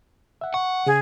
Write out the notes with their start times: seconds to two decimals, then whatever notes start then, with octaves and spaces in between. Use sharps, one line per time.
0.41 E5 F#5
0.54 F#5 C#6
0.87 C#3 G#4